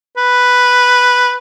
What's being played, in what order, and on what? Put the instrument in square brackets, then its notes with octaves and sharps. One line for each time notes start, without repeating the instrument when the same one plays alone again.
[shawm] B4